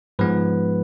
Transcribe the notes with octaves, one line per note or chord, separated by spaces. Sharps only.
G#2 F3 G#3 B3 B4